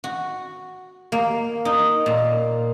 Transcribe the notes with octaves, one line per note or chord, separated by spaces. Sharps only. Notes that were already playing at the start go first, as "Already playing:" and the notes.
F#4
A#3
D#4
A#2